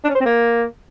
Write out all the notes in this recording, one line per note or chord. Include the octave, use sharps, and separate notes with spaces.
D4
C#4
C5
C4
A#3